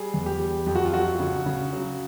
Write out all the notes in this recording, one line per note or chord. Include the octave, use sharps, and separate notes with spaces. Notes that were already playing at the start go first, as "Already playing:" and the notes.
Already playing: G3 G#4
E2
G4
G3
F2 G4
F#4
F4
F#3 F#4
C#3
C#3
F#3